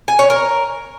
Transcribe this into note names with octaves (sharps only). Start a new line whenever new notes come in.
G#5
C#5
A#4